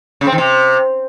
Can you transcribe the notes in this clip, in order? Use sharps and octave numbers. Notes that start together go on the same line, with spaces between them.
C#3
C4
D#3
C3